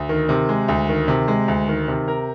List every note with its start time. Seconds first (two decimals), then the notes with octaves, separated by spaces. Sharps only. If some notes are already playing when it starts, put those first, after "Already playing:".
Already playing: D2
0.09 D#3
0.29 C3
0.49 G#3
0.68 D2
0.89 D#3
1.08 C3
1.28 G#3
1.48 D2
1.68 D#3
1.88 C3
2.08 A#4